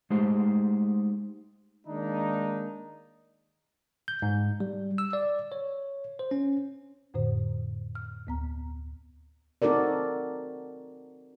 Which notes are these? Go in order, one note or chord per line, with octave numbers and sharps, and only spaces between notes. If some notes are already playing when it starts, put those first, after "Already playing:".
G#3 A3 D#4 G4 C5
D#3 G#3 A#3 D4 D#4
G6
G#2
G3
E6
D5
C#5
C5
C#4
F2 A2 D3 C5
F6
D2 B3 A#5
C4 D#4 F#4 A4 A#4 D5